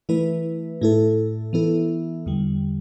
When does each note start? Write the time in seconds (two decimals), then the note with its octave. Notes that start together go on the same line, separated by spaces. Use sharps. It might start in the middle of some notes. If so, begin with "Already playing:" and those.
0.09 E3 A3 E4 B4
0.81 A2 A3 E4 A4
1.53 E3 B3 E4 A4
2.26 E2 D3 G3